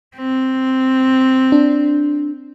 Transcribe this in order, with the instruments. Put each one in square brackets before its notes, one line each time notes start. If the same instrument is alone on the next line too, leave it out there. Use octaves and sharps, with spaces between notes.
[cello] C4
[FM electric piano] D4